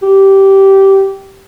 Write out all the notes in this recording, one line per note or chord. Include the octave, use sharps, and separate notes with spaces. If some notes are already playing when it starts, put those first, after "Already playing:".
G4